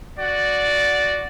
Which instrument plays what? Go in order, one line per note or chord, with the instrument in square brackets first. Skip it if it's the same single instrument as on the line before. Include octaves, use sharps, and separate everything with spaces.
[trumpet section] F#4 D5